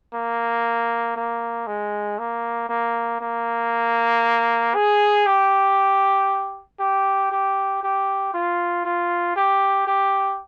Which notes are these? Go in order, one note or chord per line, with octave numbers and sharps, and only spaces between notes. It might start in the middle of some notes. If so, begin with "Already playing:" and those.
A#3
A#3
G#3
A#3
A#3
A#3
G#4
G4
G4
G4
G4
F4
F4
G4
G4